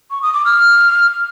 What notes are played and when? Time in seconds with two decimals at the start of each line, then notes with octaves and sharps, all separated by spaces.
0.11 C#6
0.22 D#6
0.34 D6
0.45 F6